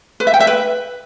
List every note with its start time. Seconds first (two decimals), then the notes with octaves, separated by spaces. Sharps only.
0.20 B4
0.27 E5
0.34 G5
0.40 E5
0.47 B4